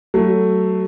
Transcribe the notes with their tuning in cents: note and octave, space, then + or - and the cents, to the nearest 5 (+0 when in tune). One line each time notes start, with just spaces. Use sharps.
F#3 +25 A3 +10